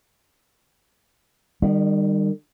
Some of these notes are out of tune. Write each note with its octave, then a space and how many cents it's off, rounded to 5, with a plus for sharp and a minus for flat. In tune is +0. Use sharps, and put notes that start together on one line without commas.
D#3 -35 G3 +10